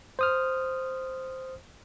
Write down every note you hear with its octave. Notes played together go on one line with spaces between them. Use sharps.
C5 D#6 F6